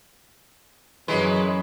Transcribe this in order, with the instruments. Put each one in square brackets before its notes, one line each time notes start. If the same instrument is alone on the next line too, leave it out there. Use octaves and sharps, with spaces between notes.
[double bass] F#2 [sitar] E3 G#3 B4